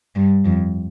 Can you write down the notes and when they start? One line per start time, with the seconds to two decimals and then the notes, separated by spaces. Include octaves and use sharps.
0.16 G2
0.45 F2